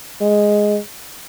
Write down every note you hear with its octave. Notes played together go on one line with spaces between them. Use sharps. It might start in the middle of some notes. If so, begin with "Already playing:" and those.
G#3